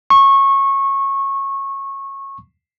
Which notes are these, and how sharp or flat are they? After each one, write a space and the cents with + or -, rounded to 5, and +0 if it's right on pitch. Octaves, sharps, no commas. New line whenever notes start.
C#6 -20